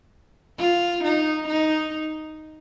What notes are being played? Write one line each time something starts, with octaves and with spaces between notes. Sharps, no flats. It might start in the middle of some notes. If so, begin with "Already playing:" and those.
F4
D#4
D#4